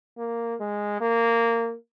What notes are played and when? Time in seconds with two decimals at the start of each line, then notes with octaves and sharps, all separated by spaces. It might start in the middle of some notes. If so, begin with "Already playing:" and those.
0.18 A#3
0.60 G#3
1.01 A#3